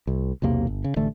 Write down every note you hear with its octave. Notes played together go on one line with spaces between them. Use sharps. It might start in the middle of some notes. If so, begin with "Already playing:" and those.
C2
B1 E2 C3 A#3
G1
C#3
A1 D3 A3